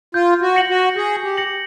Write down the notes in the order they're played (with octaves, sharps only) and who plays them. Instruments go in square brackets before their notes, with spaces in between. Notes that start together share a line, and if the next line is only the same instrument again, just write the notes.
[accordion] F4 [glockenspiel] G6
[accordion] F#4
[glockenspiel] A#6 C#7 F#7
[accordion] F#4
[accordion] G#4 [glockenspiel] G6
[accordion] G4
[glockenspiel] A#6 C#7 F#7